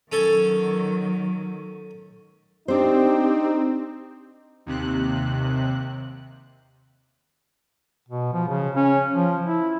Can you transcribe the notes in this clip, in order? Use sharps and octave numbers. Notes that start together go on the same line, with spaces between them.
D#3 F#3 C#4 A4 C#5
C4 D4 D#4 G4 C5
D#2 C3 F#6
B2
F3
C#3
C#4
F3
E4